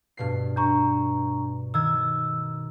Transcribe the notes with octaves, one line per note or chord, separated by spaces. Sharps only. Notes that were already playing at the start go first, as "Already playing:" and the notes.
G2 B2 C7
D4 A#5 C#6
D#3 E6 G#6